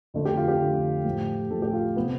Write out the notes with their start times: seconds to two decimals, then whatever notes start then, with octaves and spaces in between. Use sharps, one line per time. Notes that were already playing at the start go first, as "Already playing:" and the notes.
0.14 F2 D3 A3
0.25 G4
0.37 F4
0.48 G4
0.60 F2 D3 A3
1.05 A2 F3 A3
1.51 A2 F3 A3 A4
1.62 G4
1.73 F4
1.96 C3 F3 A3 B3